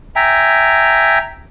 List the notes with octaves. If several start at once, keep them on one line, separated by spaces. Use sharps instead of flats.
E5 G5 G#5 A#5